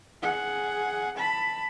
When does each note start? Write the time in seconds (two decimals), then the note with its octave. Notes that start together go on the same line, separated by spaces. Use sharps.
0.22 G#4 F#5
1.17 A5 B5